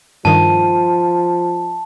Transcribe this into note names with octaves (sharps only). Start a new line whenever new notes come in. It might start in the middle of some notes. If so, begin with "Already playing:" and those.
G2 D#3 F3 A5